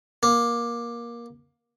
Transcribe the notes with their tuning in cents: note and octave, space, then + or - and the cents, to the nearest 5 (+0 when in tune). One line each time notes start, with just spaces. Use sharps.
A#3 +20